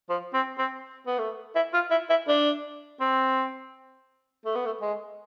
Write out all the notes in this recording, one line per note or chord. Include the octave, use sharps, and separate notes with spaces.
F3
C4
C4
B3
A3
E4
F4
E4
E4
D4
C4
A3
B3
A3
G#3